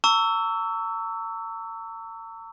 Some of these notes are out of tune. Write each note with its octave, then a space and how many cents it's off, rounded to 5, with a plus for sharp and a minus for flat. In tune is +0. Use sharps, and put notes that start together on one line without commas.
A#5 -45 C#6 +35 E6 +0